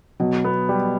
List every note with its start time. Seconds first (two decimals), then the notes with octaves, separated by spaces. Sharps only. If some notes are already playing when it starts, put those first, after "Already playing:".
0.20 B2 F#3
0.45 B3
0.69 G3